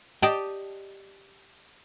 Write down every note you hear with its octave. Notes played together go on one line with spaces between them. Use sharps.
G4 D5 D#5 G5 A5